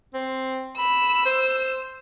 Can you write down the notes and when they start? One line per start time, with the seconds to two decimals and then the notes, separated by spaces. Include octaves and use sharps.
0.14 C4
0.78 B5 E6
1.25 C5